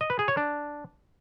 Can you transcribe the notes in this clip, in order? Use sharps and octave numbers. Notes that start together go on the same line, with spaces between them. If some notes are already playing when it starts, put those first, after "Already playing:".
D#5
B4
G#4
C#5
D4